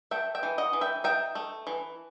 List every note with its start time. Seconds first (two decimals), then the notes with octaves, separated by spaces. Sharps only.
0.11 A3 E5 G5
0.35 E5 G5
0.43 E3
0.58 D#5 F#5
0.73 E3
0.81 E5 G5
1.04 D#4 E5 G5
1.35 A3
1.67 E3